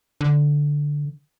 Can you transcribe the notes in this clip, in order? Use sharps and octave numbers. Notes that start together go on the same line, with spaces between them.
D3